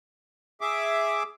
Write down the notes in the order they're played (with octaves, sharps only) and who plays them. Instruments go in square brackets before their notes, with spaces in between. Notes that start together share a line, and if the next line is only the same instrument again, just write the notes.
[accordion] G#4 E5 D6